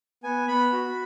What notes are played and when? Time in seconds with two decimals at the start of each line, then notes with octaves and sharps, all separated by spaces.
0.23 B3 G#5
0.48 B3 B5
0.73 F#4